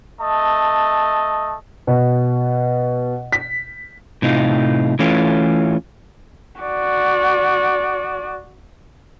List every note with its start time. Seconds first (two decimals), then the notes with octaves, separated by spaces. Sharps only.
0.21 A3 D#5 A5
1.87 B2
3.32 B6
4.22 A2 C3 D#4 F4
4.99 E3 A3 C#4 F4
6.60 F#4 D5